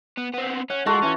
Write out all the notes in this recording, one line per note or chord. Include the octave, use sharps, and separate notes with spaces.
B3
B3 C4
C#4 F#5
G#3 F4 F#4 A4
E3 C#4